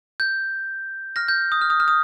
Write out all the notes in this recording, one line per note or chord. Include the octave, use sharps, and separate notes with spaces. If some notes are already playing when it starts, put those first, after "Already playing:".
G6
F6 A#6
G6
D#6
F6
D#6
F6
D#6